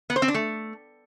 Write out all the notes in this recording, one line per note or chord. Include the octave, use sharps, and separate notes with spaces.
B3
C5
C4
D4
A3